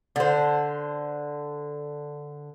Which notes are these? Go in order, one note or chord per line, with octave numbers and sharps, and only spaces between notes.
D3 C5